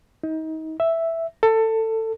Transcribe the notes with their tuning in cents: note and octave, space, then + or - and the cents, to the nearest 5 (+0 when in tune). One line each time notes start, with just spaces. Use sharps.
D#4 +30
E5 +0
A4 +20